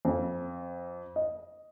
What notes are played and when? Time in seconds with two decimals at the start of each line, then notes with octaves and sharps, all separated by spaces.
0.05 F2
1.16 D#5